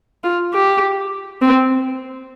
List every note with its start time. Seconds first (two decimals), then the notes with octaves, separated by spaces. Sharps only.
0.24 F4
0.53 G4
1.42 C4